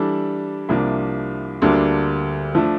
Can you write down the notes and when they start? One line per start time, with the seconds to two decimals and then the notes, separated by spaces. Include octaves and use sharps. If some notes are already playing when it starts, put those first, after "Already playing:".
Already playing: E3 G3 D4 A4
0.69 C2 C3 F3 A#3 D4
1.62 D2 D3 G3 A#3 D4
2.55 F3 A3 D4